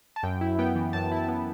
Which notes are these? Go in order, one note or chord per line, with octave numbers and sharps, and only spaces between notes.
A5
F#2 G5
E4
B3 G5
E3
F#2 A5
E4 A5
B3